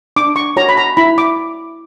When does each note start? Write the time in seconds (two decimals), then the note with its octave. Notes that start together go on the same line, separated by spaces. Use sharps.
0.16 D4 D6
0.36 C#6
0.56 F#4 C#5 A#5
0.69 B5
0.77 A#5
0.97 E4 B5
1.18 D6